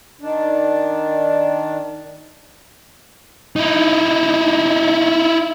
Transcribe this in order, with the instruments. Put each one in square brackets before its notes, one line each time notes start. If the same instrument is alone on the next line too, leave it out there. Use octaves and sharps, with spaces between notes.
[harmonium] D#3 D4
[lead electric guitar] D#4 E4